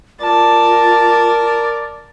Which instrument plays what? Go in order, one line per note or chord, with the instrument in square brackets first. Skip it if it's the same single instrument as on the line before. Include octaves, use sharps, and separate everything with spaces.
[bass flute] F4 [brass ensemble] A#4 [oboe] D5 [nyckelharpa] A5